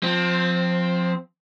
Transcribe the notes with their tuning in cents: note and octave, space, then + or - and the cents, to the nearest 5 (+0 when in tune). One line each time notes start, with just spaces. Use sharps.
F3 +20 C4 +0